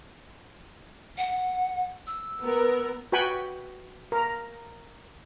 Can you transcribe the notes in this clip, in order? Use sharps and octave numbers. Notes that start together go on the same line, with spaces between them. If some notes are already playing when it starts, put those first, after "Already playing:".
F#5
E6
B3 A#4
F#4 B4 G5 G#5 B5 C#6
A#4 A#5